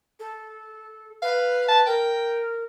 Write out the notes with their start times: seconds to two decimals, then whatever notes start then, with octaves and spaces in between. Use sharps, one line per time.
0.20 A4
1.22 B4 F5
1.68 A5
1.86 A#4 G5